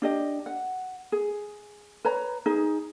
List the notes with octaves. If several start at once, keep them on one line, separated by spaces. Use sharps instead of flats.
D4 G4 D#5
F#5
G#4
B4 C#5 A#5
D#4 G#4